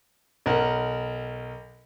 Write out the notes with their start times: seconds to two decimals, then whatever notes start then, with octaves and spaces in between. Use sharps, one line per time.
0.46 B1 A#4 F#5